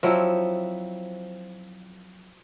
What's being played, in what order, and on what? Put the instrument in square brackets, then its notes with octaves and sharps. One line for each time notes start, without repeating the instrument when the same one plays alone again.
[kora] F3 F#3 C4 E4